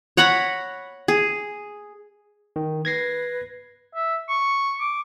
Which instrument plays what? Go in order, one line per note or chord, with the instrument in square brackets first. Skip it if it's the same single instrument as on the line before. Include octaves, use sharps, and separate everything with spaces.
[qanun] C#5 F#5 A#5 B5
G#4
[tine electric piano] D#3
[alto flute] B4 [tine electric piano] G#6 A#6 C7
[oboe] E5
C#6
D6